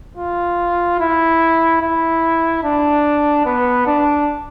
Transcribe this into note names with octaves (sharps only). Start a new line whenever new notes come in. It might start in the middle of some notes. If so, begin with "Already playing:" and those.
F4
E4
E4
D4
B3
D4